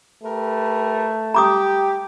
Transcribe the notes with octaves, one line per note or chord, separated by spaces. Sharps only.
A3 G4 A#4 B4
G4 A#5 D6 D#6